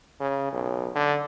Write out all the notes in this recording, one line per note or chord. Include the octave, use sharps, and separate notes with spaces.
C#3
B1
D3